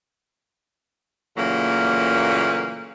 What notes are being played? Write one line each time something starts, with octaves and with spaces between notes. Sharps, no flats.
A#2 C#3 E3 F#3 A3 A#3